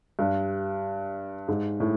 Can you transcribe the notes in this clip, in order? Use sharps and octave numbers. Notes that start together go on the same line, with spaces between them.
G2
G#2
A2